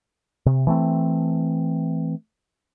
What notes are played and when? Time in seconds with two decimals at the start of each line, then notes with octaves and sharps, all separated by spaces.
0.46 C3
0.67 E3 A3 C4